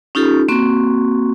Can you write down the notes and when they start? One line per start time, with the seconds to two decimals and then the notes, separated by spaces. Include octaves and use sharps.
0.15 C#4 D#4 F4 G4 A4
0.48 A#3 C4 F#4 C#6